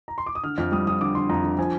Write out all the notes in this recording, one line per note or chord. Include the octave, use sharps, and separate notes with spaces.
A#5
C6
D6
D#6
D3 F6
F2 F6
G3 D#6
F2 D#6
D3 D6
D3 C6
F2 A#5
D3
F3 G#5